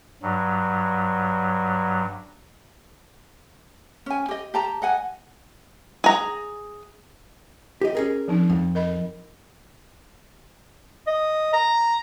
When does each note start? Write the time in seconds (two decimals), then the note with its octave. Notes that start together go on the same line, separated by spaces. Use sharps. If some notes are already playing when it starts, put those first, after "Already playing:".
0.22 G2 F#3
4.06 C#4 G#5
4.29 G4 D#5
4.54 G4 A5 A#5
4.82 D#5 F#5 G#5
6.04 G#4 A#5
7.81 G4 D#5
7.95 C#4 G#4 A#4
8.28 F3 C4 D#4
8.50 F2
8.75 A#4 D#5 B5
11.07 D#5
11.53 A#5